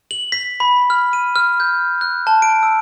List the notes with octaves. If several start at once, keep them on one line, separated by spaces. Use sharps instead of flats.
F#7
B6
B5
F6
D#7
F6
G6
F#6
A5
D7
E6